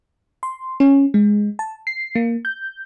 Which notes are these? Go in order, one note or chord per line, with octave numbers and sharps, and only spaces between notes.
C6
C#4
G#3
A5
C7
A#3
G6